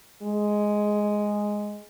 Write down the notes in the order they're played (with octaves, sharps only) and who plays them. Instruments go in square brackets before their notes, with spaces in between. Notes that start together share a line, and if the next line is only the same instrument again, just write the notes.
[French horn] G#3